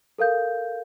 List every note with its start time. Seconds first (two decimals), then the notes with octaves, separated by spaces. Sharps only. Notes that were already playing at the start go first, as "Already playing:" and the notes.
0.18 A4 A#4 F5 G6